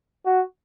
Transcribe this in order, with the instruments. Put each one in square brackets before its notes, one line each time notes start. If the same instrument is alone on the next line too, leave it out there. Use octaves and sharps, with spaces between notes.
[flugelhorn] F#4